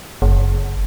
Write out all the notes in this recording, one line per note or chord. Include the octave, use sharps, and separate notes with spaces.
F#1